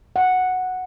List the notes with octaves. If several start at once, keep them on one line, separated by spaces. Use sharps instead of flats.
F#5